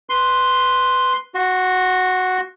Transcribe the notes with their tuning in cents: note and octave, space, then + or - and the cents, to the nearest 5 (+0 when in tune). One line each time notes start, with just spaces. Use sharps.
B4 +0 C6 +0
F#4 +0 C6 +40